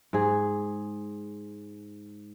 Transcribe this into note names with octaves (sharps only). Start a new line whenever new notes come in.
G#2 G#4